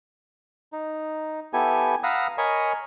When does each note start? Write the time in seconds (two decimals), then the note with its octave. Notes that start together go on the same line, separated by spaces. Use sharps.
0.73 D#4
1.53 B3 E4 G4 A4 G#5
2.03 F5 F#5 A#5 B5 D#6 E6
2.38 A#4 C#5 D#5 G#5 B5 C#6